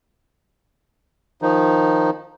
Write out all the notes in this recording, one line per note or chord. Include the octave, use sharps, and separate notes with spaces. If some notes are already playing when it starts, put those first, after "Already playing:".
D#3 F3 D#4